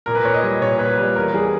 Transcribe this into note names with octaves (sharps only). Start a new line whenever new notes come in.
A#2 A#4
B4
A#2 C#5
D#5
G3
A#2 C#5
A#2 B4
G3 B4
E2 A#4
G3 G#4